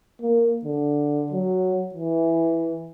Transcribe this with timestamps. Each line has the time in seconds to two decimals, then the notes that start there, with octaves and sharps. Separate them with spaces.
0.22 A#3
0.64 D3
1.32 F#3
1.95 E3